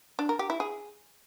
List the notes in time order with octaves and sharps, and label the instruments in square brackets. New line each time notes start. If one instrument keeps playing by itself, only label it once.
[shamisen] D4
A#4
G4
E4
G#4